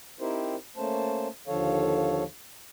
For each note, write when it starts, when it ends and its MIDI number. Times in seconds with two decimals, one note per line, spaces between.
0.20 0.55 60
0.20 0.55 63
0.20 0.55 64
0.20 0.55 67
0.20 0.55 70
0.20 0.55 72
0.77 1.28 57
0.77 1.28 58
0.77 1.28 61
0.77 1.28 72
0.77 1.28 81
1.47 2.23 39
1.47 2.23 50
1.47 2.23 53
1.47 2.23 69
1.47 2.23 73
1.47 2.23 77